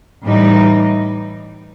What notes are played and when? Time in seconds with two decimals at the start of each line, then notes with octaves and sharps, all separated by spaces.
0.24 A2 E3 G3 D#4